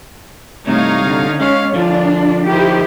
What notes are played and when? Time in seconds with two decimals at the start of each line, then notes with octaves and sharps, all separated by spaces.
0.67 G2 C3 A3 D#4 C#5 F5
1.05 D3
1.41 G#3 C#4 C#5 F5
1.74 D3 F3 D4 F4
2.48 D#3 E4 G4 C5